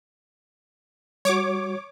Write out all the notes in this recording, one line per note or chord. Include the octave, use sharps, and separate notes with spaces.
G3 F#4 C#5 D6